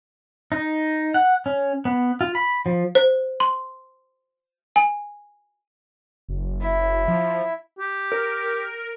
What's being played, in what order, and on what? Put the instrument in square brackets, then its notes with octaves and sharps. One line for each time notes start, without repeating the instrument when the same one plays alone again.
[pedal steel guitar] D#4
F#5
C#4
B3
F4
B5
F3
[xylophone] C5
C6
G#5
[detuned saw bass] F#1
[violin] E4
[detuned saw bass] F3
[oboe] G4
[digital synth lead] A#4